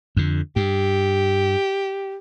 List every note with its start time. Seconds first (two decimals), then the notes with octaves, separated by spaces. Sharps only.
0.17 F2 D3
0.56 G2 G4